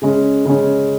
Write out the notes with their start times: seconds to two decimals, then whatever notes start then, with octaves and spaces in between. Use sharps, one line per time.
0.02 C#3 G#3 C#4
0.45 C#3 G#3 C#4